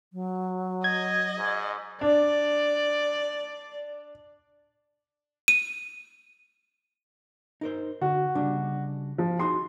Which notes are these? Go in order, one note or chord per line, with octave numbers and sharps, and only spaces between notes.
F#3
D#5 G#6
G#2
D4 D5
D#7
D#4 A#4 C5
D3 F#4
C#3 G3 D4
F3
D#4 F#4 G#4 C6